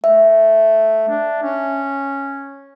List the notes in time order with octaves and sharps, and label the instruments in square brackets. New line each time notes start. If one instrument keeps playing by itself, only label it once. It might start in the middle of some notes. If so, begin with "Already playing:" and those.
[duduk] A3 [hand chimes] E5
[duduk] D4
C#4